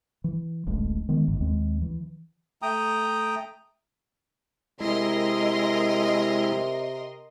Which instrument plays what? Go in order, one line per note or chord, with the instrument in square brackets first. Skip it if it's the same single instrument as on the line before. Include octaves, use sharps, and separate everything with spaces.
[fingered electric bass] E3
D1 A1 A2 G#3
D#3 G#3 B3
G1 C#2 G#2
D#2 G#3 C4
E3
[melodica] A3 G5 A#5 D#6
[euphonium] C3 [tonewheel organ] G#3 E4 [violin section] A#4 D#5 C6